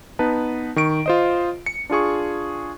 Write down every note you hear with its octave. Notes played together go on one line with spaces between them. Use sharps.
B3 D#4 B4 A5
D#3 C#6 D7
F4 C5 D#5
C#7
D4 F4 G#4 C#6